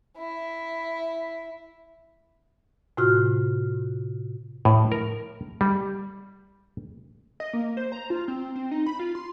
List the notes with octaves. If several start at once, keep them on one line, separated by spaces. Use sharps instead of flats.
E4
A2 C3 F4 F#4 F6
A2
A#4
G3
D#5
A#3
C5
A#5
F4
C4
C4
D#4
B5
F4
C6